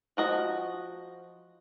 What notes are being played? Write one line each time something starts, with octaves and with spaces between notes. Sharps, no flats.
F3 F#4 D#5